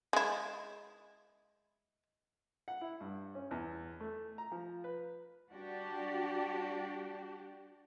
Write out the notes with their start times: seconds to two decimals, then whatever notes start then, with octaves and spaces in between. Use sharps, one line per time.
0.13 G#3 E4
2.68 F#5
2.81 E4
3.00 G2
3.35 C#4
3.51 E2
4.00 A3
4.38 A#5
4.52 F3
4.84 B4
5.50 G3 D4 F#4 G4